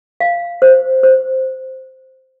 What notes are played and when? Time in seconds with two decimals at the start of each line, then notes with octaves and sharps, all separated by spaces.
0.20 F5
0.62 C5
1.03 C5